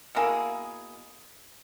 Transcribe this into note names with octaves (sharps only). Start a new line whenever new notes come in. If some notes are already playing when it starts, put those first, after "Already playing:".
B2 A#3 E4 G#4